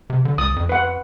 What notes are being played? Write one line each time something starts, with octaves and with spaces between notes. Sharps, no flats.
C3
D3
C#2 D#6
F2
B4 F#5